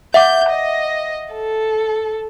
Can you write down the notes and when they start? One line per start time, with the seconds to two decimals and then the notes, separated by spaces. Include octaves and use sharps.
0.14 E5 F#5 D6 G6
0.50 D#5
1.34 A4